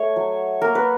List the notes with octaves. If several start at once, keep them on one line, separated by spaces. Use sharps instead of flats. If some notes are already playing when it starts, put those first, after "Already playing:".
Already playing: A3 C#5
F#3
A#3 A#4
B4